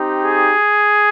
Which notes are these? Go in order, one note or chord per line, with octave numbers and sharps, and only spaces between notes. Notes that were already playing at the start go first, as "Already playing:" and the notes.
Already playing: C4 D#4 G4
G#4